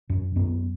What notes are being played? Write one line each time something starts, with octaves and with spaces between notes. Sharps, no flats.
F#2
F#2 B3